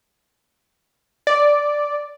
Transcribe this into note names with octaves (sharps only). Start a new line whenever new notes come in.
D5